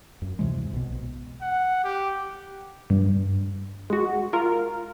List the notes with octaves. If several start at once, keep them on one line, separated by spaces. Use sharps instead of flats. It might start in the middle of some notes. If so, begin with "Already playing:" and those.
F#2
D2 C3 E3 G#3
B1 B2
F#5
G4
G2
G#3 F#4
F4 A#4